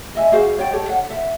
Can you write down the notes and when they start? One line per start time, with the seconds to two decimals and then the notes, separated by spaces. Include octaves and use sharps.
0.15 D#5 E5 G#5
0.32 F#4 G#4 C5 F5
0.58 C#5 D5 G5
0.72 G4 A4 C#5 D5
0.89 F#5
1.10 E5